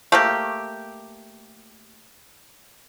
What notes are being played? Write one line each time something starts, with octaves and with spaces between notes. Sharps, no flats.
A3 A#3 G4